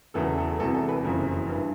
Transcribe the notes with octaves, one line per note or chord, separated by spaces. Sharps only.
E1 E2 C#3 E3 A4
A4
E1 E2 C3 E3 A4
A4
B4
F#1 F2 C#3 E3 A#4
G2 E3